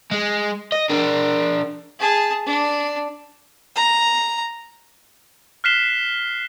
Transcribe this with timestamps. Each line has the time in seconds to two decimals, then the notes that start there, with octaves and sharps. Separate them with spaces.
0.12 G#3
0.72 D#5
0.89 D4 A#4
1.99 G#4 A5
2.46 D4
3.76 A#5
5.64 F6 F#6 B6 C7 E7 G7